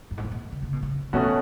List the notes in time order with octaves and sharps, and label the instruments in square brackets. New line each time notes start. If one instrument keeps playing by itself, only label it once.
[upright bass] F#2
G#2
A2
B2
D3
C#3
B2
C#3
[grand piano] B2 A3 C#4 F#4 [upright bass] E3